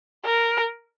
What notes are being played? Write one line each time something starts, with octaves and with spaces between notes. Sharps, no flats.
A#4